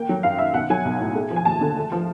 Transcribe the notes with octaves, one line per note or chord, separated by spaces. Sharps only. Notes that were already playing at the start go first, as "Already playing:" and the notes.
Already playing: A#3 G5
F#3
F#2 F5
D#3 E5
B1 F#5
F#3 G#5
B1
A2
G#3
F3
G#5
D#2 A5
D3
A3
F3